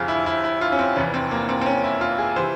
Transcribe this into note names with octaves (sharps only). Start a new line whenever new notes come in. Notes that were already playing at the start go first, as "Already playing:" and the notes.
Already playing: G1 F2 C3 F4 G#4
E4
E4
E4
F4
C#4
C4
F1 E2 E3 C#4
C4
A#3
C4
C4
C#4
E4
F4
G#4
C3 E3 C5